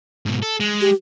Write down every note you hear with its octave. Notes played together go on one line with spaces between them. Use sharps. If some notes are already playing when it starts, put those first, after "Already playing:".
G#2 B2
A4
G#3
G4